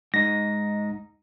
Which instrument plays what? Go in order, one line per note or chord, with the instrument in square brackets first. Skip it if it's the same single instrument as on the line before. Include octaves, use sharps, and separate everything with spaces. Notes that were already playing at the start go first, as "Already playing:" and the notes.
[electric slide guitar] G#2 D#4 [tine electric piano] A#6